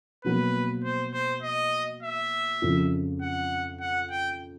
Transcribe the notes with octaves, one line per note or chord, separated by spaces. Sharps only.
B2 F#3 A#3 B4
C5
C5
D#5
E5
F2 C#3 F3
F#5
F#5
G5